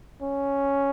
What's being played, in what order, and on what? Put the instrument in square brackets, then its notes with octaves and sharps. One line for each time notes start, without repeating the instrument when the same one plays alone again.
[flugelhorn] C#4